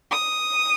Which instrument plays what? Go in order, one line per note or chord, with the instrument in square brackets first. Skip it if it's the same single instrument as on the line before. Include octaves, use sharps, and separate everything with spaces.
[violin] D#6